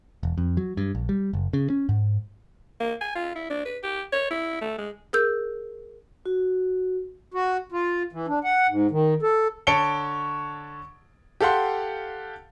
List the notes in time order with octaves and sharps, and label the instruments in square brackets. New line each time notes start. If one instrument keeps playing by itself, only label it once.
[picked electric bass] E1
F2
F#3
G2
A#1
G3
F#1
C#3
C#4
G#2
[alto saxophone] A#3
G#5
F4
E4
D4
B4
G4
C#5
E4
A3
G#3
[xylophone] G#4 A#4 E6 G6
[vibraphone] F#4
[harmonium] F#4
F4
E3
D4
F#5
G#2
D#3
A4
[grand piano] D3 C#5 A5 C#7 D7 G7
G4 A4 F5 F#5 C6